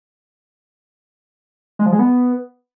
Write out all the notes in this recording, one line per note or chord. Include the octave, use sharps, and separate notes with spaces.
G#3
F3
G#3
B3